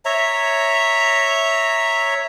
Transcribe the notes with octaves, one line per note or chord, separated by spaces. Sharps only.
C#5 E5 A#5